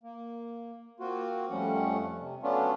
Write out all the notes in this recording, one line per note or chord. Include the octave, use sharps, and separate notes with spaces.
A#3
A#3 C4 F4 F#4
F2 F3 G3 A3 C#4 F#5
C3
F#3 A3 B3 C#4 D4 F4